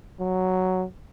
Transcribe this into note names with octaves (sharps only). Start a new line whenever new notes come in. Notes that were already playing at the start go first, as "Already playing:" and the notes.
F#3